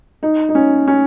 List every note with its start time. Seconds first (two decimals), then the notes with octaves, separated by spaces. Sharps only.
0.23 D#4
0.49 D#4
0.55 C#4
0.88 C#4